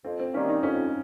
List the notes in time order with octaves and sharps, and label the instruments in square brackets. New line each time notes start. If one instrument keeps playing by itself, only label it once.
[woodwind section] F2 [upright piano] C4
[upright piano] C4
[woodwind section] D#3 G3 A#3 [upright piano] C#4
[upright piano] D#4
[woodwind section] F2 [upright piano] C#4